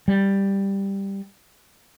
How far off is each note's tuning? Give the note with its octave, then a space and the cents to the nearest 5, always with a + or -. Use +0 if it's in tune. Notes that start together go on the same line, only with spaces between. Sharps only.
G3 +5